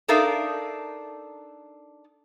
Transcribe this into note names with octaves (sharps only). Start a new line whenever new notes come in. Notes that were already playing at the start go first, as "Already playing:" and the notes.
D4 D#4 A4 A#4 E5 F5